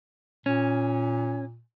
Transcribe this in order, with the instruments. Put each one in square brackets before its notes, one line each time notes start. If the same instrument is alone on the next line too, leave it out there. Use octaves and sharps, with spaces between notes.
[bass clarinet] A#2 [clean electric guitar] C#4